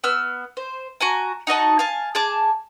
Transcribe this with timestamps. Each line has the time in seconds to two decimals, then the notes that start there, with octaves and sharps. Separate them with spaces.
0.04 B3 E6 F6
0.57 C5
1.00 F#4 G#5 A#5
1.47 D#4 F#4 D#5 A5
1.79 F5 G#5 A5
2.15 G#4 A5 D6